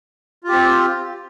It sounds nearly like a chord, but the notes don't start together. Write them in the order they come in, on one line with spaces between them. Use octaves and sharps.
F4 G4 C4